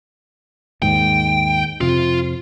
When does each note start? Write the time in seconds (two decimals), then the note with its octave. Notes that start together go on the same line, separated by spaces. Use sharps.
0.82 D#2 G#2 G5
1.81 F2 C3 F4